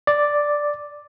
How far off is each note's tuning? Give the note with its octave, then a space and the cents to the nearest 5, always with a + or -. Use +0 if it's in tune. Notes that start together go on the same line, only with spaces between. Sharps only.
D5 +0